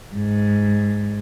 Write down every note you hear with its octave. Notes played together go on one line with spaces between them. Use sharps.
G#2